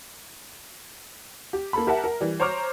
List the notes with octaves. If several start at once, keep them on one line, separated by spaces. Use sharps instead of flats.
G4
A#3 A4 B5
G4 A#4 E5 F#5 A5
A#4
E3 G3
C5 C#5 A#5 C#6 D6 F6